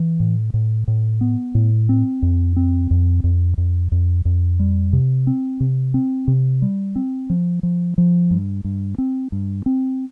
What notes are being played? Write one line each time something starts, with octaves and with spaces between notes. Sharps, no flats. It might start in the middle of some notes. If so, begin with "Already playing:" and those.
Already playing: E3
A2
A2
A2
B3
A2
C4
F2
C4
F2
F2
F2
F2
F2
G3
C3
C4
C3
C4
C3
G3
C4
F3
F3
F3
G2
G2
C4
G2
C4